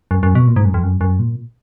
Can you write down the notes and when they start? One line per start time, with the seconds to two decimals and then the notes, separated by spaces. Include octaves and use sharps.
0.11 F#2
0.23 F#2
0.35 B2
0.48 A#2
0.56 G#2
0.65 F#2
0.74 F2
0.83 F#2
1.01 F#2
1.19 A#2